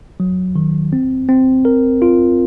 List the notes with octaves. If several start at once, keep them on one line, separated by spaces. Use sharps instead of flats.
F#3
D#3
C4
C4
A#4
F4